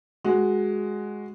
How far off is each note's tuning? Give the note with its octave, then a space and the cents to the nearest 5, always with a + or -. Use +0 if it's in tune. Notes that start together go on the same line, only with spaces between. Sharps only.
G#3 +0 F#4 +0